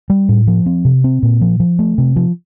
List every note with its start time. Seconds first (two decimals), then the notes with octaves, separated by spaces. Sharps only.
0.10 G3
0.29 A2
0.47 F3
0.66 C4
0.85 C3
1.04 C4
1.23 A#2
1.41 F3
1.60 F3
1.79 A3
1.98 C3
2.16 F3